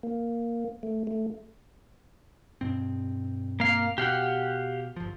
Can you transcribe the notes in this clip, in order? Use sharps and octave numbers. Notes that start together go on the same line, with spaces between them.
A#3
A3
A3
G2 B2 C4
A#3 F5
B2 G4 F5 F#5
G1 F3